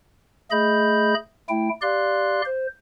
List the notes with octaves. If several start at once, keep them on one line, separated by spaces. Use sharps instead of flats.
A3 G#4 D#5 B5 G6
A3 E4 G5
G4 D5 F5 C6 F#6
C5